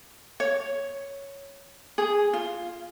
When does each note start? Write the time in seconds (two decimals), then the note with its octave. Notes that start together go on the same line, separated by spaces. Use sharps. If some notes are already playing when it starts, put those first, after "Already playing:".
0.40 C#5
1.98 G#4
2.33 F4